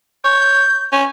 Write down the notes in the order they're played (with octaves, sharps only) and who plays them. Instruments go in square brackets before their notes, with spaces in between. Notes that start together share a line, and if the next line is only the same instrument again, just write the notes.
[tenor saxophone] C#5 [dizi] G6
[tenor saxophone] C#4